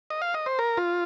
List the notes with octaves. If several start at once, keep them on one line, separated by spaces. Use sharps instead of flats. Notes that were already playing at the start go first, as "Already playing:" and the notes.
D#5
F5
D#5
C5
A#4
F4